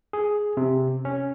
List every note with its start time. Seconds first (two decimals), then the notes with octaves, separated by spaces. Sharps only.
0.13 G#4
0.57 C3
1.05 C#4